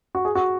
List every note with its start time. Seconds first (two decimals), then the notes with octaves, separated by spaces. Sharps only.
0.15 F#4
0.25 G#4
0.35 F#4